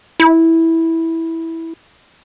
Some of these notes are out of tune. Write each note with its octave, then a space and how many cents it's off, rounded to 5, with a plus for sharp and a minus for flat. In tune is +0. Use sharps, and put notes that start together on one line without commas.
E4 -10